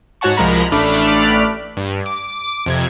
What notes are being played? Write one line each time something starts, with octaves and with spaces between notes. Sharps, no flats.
G#2 F#4 C#5 F#5 A5 C#6
C2 F3 G#3 A#4 A#5 B5
A1 A3 D4 B5 D6 F6
G2
D6
F2 C3 G#6